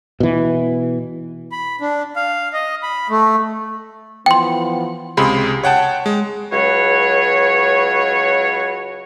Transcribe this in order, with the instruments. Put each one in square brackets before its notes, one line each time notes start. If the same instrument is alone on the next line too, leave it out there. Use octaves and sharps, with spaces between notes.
[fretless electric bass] B2 E3
[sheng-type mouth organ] B5
D4
F5
D#5
B5
A3
[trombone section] E3 F3 B3 [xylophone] G5 C6
[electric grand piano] C#2 C3 G#4 B5 C6
C#5 F#5 G5 A5
G#3
[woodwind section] C#2 F#3 B4 C#5